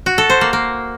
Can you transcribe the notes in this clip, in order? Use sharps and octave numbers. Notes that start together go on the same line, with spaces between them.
F#4
A4
C5
A#3
A#3